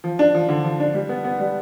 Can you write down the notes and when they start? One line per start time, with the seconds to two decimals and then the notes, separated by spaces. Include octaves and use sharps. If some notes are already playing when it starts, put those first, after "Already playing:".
0.04 F3
0.19 D4
0.35 F3
0.49 D3
0.64 F3
0.80 D4
0.95 G3
1.09 B3
1.24 B3
1.39 G3